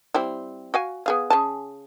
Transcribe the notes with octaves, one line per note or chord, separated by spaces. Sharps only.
G3 C4 E4
F#4 F5 G#5
B3 G#4 F5
C#3 G#4 A5